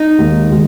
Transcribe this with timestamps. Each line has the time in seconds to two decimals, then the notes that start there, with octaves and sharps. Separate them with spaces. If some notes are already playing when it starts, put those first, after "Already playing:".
Already playing: D#4
0.19 D#2 D#3 G#3
0.51 D#3 G#3